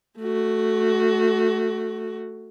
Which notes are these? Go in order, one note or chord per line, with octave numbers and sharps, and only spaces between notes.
A3 F#4